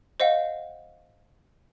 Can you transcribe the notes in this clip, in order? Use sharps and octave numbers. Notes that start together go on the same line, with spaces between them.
C5 D#5 F5 F#5